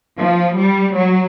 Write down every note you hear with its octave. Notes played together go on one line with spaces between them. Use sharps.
F3
G3
F#3